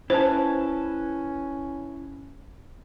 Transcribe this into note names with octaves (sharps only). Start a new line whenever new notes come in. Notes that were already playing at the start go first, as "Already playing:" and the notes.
C#4 E4 B4 C5 A5